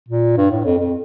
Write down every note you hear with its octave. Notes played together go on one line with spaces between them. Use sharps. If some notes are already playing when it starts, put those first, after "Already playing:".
A#2
G2
A2
F2
F2